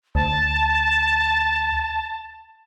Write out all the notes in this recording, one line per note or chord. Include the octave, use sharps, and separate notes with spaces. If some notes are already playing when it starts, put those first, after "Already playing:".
D2 A5